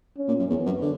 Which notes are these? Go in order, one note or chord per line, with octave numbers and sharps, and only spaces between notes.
C#4
A#2
F#2
E2 B3
F#2
D3